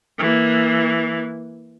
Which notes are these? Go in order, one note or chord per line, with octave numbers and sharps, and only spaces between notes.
E3 A#3